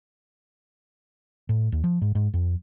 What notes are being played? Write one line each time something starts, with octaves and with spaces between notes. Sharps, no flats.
A2
D#2
F3
G#2
G#2
F2